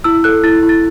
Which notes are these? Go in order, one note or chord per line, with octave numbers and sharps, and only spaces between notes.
E4 E6
A4 F#6
E4 A6
E4
A6